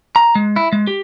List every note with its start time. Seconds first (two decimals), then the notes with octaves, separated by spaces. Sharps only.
0.16 A#5
0.35 G#3
0.56 E4
0.72 G#3
0.87 G4